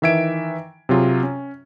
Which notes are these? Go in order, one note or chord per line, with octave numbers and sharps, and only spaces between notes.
D#3 E3 E5 G#6 D7
C3 F#3 F4 G#4
C#4